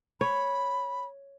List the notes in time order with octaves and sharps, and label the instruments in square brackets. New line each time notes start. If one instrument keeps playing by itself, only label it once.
[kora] C#5 [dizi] B5